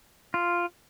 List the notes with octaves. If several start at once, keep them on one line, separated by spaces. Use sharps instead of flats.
F4